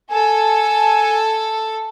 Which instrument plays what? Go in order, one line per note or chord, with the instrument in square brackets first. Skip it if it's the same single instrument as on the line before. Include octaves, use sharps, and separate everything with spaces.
[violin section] A4 [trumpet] G#5